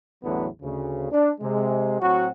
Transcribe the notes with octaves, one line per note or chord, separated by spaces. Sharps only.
A1 E2 A2 D3 F#3 B3
D2 C#3
D4
C3 G#3
A2 F#3 C4 F#4